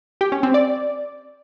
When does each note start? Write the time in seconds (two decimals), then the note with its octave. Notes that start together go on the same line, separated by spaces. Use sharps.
0.21 G4
0.32 C#4
0.43 C4
0.54 D5